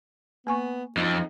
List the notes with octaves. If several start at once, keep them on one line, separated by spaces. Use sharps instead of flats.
A#3 B3 G#5 C#6
F2 D#4